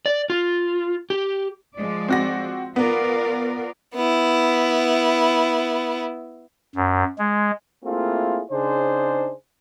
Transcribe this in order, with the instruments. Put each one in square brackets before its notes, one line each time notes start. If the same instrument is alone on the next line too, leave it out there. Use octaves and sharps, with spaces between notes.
[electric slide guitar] D5
F4
G4
[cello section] F3 G#3 D5
[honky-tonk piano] C4 F#4 A#6
[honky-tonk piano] B3 [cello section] F4 A#4 D5
[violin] B3 E4
[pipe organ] F#2
G#3
[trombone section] A3 A#3 C4 E4 F4 G#4
C#3 D4 D#4 G#4 C5